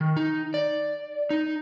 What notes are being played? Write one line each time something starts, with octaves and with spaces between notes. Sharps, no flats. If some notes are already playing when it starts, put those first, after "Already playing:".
D#3
D#4
D5
D#4